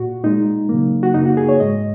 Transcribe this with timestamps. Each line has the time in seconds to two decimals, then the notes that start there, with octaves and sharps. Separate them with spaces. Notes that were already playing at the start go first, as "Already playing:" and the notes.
Already playing: A#2 F#4
0.24 A#2 G#3 D#4
0.69 C#3 F#3 A#3
1.03 F#4
1.14 F#2 C#3 A#3 D#4
1.26 F#4
1.37 G#4
1.49 C#5
1.60 G#2 G#3 D#5